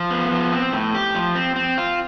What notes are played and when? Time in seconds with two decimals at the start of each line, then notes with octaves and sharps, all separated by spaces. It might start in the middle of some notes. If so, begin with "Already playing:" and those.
Already playing: F3
0.10 B3
0.31 F3
0.52 C4
0.73 A2
0.94 G4
1.15 F3
1.35 C4
1.56 C4
1.78 F4